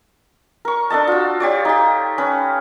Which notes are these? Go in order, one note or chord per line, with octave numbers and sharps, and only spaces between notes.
A#4 C#6
D4 A4 D#5 A5
F4 F#4
G4 C#5 D5
D#4 G4
C#4 B4